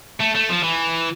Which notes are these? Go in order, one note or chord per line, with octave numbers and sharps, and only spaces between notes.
A3
A3
F3
E3